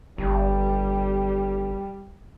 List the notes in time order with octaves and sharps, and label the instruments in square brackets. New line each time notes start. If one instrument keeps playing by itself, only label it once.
[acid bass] G1 [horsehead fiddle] G3